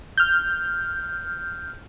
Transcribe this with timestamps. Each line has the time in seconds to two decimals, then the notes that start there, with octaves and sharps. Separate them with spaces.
0.18 F6 G6